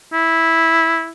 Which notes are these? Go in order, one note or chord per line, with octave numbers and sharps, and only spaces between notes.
E4